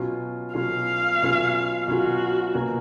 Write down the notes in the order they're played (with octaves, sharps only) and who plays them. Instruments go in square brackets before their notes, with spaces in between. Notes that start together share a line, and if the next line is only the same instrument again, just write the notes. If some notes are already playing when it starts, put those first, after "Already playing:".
Already playing: [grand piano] B2 F#3 C#4 F4
[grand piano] B2 F#3 C#4 F4 [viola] F5
[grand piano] B2 F#3 C#4 F4
[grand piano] B2 F#3 C#4 F4 [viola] F#4
[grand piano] B2 A#3 C#4